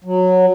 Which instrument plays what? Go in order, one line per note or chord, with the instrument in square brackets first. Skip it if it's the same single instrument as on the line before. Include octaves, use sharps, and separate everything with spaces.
[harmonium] F#3